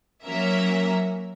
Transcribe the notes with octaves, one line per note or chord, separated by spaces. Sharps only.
F#3 A#3 C#4 A#4 E5